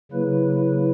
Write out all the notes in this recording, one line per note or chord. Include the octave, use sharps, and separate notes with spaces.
C#3 F#3 A#3 E4 B4